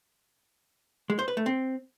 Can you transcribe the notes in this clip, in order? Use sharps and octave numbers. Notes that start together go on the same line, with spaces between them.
G#3
C5
B4
A3
C4